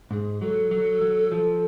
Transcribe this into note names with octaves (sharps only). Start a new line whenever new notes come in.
G#2 G#4
F#3 A4
F#3
F#3
F3